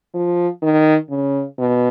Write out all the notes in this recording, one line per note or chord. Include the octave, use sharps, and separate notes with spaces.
F3
D#3
C#3
B2